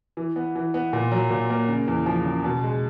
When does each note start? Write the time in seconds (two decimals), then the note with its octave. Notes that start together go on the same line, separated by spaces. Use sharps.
0.17 E3
0.36 B3
0.55 E3
0.74 B3
0.93 A#2
1.12 F#3
1.31 A#2
1.50 A#3
1.69 C#3
1.88 E2
2.06 F3
2.25 C#3
2.44 B2
2.63 G#3